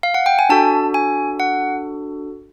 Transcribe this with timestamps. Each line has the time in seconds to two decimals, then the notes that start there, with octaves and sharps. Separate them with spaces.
0.03 F5
0.14 F#5
0.26 G5
0.39 G#5
0.49 D4 F#4 A4 A5
0.94 G#5
1.40 F#5